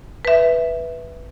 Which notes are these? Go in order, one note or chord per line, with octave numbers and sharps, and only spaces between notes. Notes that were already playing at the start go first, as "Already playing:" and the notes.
B4 E5